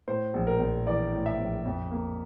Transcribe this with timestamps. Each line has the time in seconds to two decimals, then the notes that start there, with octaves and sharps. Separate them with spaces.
0.08 A2 C5
0.34 A#1
0.47 A#4
0.60 A#1
0.86 E3 D5
1.12 A2
1.26 E5
1.39 A#1
1.65 F2
1.91 A#3